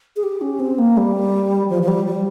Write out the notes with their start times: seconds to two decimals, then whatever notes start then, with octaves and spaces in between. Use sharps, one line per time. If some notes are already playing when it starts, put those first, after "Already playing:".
0.16 G#4
0.23 G4
0.41 C#4
0.60 C4
0.78 A#3
0.97 G3
1.70 F3
1.82 F3
1.88 G3
2.06 G3